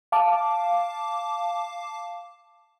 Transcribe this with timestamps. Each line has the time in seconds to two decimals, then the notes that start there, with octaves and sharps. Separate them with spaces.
0.12 F5 A5 D6